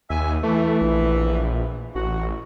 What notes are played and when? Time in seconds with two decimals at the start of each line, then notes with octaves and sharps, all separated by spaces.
0.10 D#2 E5 G#5
0.43 E3 A3
0.81 A#1
1.95 A1 F#4